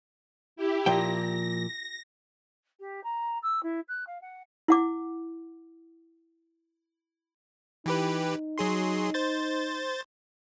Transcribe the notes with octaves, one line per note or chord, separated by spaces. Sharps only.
E4 G4
A#2 F3 G5 A#6
G4
A#5
E6
E4
F#6
F5
F#5
E4 F#5 D6
E3 D#4 G4 B4
F#3 G#4 C6
C5 A6